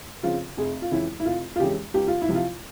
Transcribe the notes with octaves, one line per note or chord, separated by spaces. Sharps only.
C#3 F3 C4 F4
F1 G#4
F4
F2 E3 G#3 C#4 E4
E4
F1 F4
F4
F2 E3 G#3 C#4 G4
C#2 G4
F4
E4
C3 F3
F4